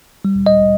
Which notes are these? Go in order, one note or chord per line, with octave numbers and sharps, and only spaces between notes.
G3
D#5